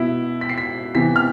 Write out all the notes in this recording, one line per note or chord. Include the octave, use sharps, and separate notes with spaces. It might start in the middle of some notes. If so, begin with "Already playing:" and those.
Already playing: B2 B3 E4 B6
B6
C7
B6
C3 E3 B3 B6
F6